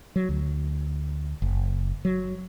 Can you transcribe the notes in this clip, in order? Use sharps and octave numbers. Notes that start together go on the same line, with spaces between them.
F#3
D2
F#1
F#3